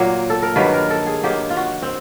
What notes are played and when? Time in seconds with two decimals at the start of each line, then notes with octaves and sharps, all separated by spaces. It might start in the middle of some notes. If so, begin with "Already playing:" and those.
Already playing: A#2 F#3 A#3
0.30 A4
0.43 A#4
0.56 G2 D#3 F#3 A#3 B4
0.73 A#4
0.90 A4
1.07 G#4
1.23 G2 D#3 F#3 A#3 G4
1.50 F4
1.57 F#4
1.82 C4